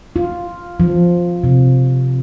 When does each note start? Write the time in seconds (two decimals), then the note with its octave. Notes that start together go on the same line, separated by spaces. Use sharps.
0.16 F4
0.80 F3
1.44 C3